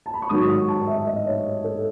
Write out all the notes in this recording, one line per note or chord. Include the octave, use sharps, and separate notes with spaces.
A5
B5
C#6
G#2 D#3 F#3 D#6
C#6
A5
E5
D#5
C#5
A4